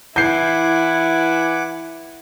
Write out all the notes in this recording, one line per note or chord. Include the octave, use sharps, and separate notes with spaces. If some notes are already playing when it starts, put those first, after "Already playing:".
E3 E4 F#5 G#5 D6 G6 C7